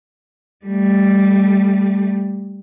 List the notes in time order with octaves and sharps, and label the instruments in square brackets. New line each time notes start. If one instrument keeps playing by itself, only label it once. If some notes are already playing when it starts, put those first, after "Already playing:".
[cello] G3 A3